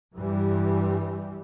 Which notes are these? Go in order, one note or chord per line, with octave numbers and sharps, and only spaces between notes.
G2 E3 G3